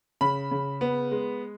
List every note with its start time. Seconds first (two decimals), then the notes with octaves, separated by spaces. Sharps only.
0.21 C#3 B5
0.51 C#3
0.81 B3
1.11 G#3